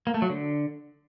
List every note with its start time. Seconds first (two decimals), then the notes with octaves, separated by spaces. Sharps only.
0.07 A#3
0.14 A3
0.22 F#3
0.30 D3